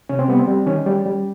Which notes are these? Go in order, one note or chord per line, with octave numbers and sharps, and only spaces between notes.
C3 C#4
C4
G3 B3
C4
G3
D#3 C#4
G3
G3